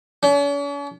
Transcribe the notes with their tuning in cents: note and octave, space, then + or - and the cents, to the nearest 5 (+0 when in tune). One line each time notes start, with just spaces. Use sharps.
C#4 +45